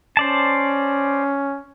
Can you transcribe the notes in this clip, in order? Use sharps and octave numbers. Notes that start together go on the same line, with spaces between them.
C#4 C5 D5 A5